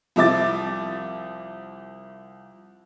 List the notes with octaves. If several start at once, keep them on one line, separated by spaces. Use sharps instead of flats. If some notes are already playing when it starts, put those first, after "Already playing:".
C2 F3 E5 D6 A6